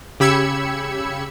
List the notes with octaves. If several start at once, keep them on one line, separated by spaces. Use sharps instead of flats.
C#3 G4 B5 E6 G#6 C#7